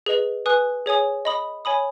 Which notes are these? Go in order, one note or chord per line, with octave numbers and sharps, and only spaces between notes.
G#4 B4 D#5
B4 G#5 D#6 F#6
G#4 C#5 G#5 D#6
D#5 B5 D#6
C#5 G#5 B5 D#6